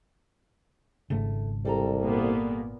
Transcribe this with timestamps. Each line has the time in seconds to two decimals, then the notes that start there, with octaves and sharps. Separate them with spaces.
1.10 G#1 G#2 C#3 A3
1.65 C2 G3 A4 A#5
2.02 A#2 A#3 B3